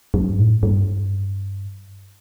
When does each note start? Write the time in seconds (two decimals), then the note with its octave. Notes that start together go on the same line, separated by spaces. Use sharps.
0.14 F#2
0.29 G2
0.39 A2
0.63 G2